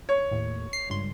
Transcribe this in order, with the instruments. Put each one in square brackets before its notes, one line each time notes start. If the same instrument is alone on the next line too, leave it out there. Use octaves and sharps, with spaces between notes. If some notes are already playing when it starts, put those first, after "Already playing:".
[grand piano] C#5
[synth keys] D#2 A2
C7
C#2 G2 C6